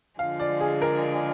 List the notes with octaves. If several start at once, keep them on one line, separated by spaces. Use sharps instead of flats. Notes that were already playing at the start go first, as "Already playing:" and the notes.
D3 F3 G#3 F5
D5
G#4
A#4